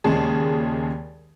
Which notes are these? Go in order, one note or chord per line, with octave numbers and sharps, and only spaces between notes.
D#2 A#2 C#3 G#3 G#4 A5